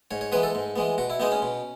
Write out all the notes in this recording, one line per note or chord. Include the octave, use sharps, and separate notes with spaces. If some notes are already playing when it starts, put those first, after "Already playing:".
G#2 C#5
C#5
E3 G#3 B3 B4
A4
G#2
E3 G#3 B3
B2 F#4
E4
G#3 B3 D#4
C#4
B2